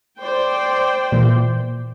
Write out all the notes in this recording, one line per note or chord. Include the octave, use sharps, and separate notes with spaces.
C5 D5 G5
A#2 E3